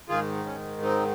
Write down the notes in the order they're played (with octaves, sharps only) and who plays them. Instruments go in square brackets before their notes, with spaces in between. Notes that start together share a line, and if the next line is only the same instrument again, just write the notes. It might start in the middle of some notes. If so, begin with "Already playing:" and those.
[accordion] G#2 D#3 F4 G#4
C#4
C4 D#4